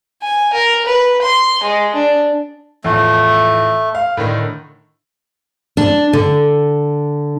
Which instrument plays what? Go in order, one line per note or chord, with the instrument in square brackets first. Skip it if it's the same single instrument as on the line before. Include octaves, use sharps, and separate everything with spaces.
[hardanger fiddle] G#5
A#4
B4
C6
G#3
D4
[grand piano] E2 A2 F3 [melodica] A3
[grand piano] F5
A2 D3 D#3
[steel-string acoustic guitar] D4
D3